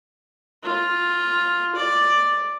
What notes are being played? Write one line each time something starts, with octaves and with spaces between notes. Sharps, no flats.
F4
D5